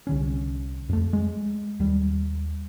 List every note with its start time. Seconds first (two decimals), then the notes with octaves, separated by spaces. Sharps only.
0.07 C2 D3 C#4
0.89 F2 A3
1.13 G#3
1.80 D#2 G3